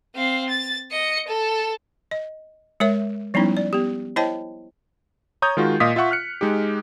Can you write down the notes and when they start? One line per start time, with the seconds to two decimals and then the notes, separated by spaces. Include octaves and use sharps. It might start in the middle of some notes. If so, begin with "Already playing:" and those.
0.15 C4 F5
0.49 A6
0.91 D#5 C#7
1.27 A4
2.11 D#5
2.80 G#3 A#4 C#5 E5
3.34 F3 G3 B3 C#4 D#4 E4
3.57 D5
3.73 B3 G4
4.16 E4 C5 C#5 D#5 G5 A5
5.42 C#5 A#5 D#6 G6
5.57 D#3 G#3 F4 F#4
5.80 A#2 D#5 F5 D#6 B6
5.96 F4 E5 F#5 C#6
6.11 F6 F#6 C#7
6.41 G#3 D#4 G4